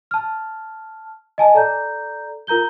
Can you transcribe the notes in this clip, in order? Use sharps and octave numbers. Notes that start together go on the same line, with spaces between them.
A5 F6
D#5 G#5 A5
A4 D5 A#5 G6
F4 A#4 A#5 G6 G7